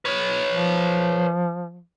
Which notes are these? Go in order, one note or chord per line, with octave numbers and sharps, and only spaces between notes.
B4 C#5
F3